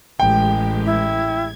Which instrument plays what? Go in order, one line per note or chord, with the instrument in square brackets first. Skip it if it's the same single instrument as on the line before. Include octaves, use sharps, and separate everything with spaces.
[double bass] A1 [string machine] G#3 G4 [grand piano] G5
[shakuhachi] E4 [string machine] G#6